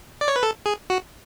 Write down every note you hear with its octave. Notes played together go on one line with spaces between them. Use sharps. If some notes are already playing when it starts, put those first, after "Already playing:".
D5
C#5
B4
A4
G#4
F#4